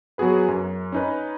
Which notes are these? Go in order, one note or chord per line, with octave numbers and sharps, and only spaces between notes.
F#3 B3 F#4 G#4 B4
F#2
C#4 D#4 B4